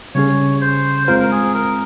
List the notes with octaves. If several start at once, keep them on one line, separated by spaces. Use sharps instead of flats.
C#3 G3 C#4 G#4 C#5
C5
G#3 C4 F4 A#4 C5
A#4
G#4
A#4